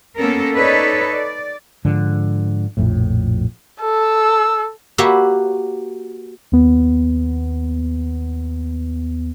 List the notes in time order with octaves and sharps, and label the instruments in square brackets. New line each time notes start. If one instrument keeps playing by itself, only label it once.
[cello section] A#3 B3 C#4 A4 A#4
D#4 A4 B4 C#5 D5
D5
[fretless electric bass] G#2 D3 F3
A#1 F2 A2
[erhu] A4 [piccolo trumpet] E6
[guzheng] A#3 F#4 G4 B4 C#5 E5
[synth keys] D#2 B3